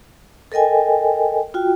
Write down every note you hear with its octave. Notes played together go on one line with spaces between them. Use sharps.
A4 A#4 D#5 G5 G#5
F4 F#4 G5